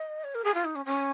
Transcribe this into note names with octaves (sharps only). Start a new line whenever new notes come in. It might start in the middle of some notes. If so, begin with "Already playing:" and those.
Already playing: D#5
C#5
A#4
G#4
F4
D#4
C#4
C#4